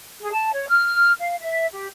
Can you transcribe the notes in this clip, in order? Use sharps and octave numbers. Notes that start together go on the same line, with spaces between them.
G#4
A5
C#5
F6
F5
E5
G4